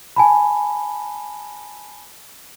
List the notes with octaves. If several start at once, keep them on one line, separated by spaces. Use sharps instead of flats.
G#5 A5 B5